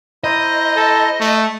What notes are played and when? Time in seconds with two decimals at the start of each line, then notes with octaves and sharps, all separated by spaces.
0.24 E4 C5 D#5 A#5
0.75 A4
1.20 A3